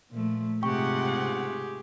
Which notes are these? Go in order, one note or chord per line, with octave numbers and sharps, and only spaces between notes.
A#2 F3 A3
G#2 C3 F4 G4 G#4 F#5 G5 C#6